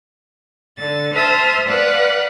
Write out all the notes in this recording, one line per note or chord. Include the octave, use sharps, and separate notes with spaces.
D3 A6
C5 E5 A5 D#6 F6
B4 D5 F5 F#5